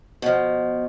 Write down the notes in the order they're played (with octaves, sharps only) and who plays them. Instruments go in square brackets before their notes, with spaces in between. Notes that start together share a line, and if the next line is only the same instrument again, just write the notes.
[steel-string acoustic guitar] B2 F3